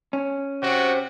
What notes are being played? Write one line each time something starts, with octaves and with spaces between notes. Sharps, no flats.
C#4
C3 C4 F#4